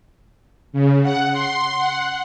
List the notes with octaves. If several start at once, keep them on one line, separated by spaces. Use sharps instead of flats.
C#3
F#5
C6
F#5